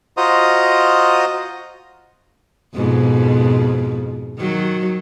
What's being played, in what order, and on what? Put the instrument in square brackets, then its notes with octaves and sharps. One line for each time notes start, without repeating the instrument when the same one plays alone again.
[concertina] F4 F#4 C5 D#5 A#5 D#6
[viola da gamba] F2 G#2 B2
D#3 F#3